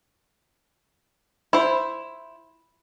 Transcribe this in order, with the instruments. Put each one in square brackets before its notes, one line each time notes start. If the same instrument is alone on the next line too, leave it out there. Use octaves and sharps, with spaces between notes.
[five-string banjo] E4 C5 [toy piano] B5